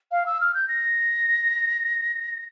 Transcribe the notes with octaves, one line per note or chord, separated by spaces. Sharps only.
F5
E6
F6
G6
A#6